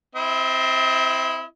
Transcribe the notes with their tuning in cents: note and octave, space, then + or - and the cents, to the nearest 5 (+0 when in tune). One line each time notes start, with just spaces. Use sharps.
C4 +0 E4 +0 D#5 +45